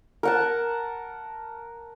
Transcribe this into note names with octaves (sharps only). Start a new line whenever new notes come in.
A#4 F#5 A5